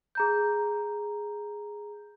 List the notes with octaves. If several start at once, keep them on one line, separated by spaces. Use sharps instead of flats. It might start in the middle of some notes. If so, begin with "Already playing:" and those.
G#4 A#5 G6